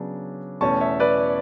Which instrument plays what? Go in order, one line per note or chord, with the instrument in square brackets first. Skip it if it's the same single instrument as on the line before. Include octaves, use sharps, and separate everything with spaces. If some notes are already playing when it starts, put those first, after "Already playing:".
Already playing: [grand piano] C#3 F#3 B3 D4
E2 B2 A3 C#4 A5 C#6
C#5 E5
B4 D5